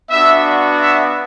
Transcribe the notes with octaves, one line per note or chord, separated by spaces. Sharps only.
B3 D4 F#4 E5
E5